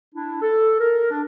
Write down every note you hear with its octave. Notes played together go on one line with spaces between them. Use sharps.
D4 E4
A4
A#4
D4